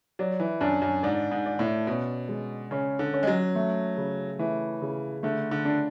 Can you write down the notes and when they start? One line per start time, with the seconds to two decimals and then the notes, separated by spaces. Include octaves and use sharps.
0.19 F#3 D5
0.40 E3
0.61 F#2 D4
0.82 F#2
1.03 G#2 D5
1.31 G#2
1.46 D5
1.59 A2
1.87 B2 C#4
2.29 G#3
2.71 C#3 C#4
2.99 D3
3.14 C#4
3.23 G#3
3.27 F#3
3.55 A3
3.97 C#3
4.39 E3 A3
4.82 C#3
5.23 D3 A3
5.51 D3
5.65 D4